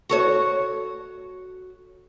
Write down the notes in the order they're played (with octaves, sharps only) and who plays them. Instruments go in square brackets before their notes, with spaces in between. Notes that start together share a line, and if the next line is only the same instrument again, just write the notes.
[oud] F#4 A4 C#5